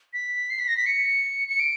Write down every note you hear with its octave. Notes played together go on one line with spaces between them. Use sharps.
B6
C7
B6
A#6
B6
C#7
C#7
D7